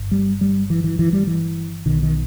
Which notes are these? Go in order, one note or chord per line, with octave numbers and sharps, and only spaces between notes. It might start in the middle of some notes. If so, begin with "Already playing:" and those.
Already playing: G1 G2
G3
G3
E3
E3
E3
G3
E3
B1 B2 D#3
D#3